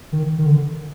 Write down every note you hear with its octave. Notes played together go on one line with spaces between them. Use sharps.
D#3
D#3
D3